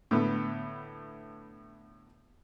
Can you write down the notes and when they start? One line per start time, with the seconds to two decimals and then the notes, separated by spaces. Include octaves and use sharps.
0.11 A2 D3 B3